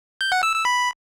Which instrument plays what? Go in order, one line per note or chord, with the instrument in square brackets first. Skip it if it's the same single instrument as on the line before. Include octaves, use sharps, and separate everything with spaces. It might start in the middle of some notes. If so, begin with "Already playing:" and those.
[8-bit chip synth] G6
F#5
E6
E6
B5